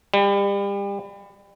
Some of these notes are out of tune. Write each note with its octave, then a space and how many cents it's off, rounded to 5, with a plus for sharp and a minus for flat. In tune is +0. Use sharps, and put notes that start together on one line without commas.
G3 +35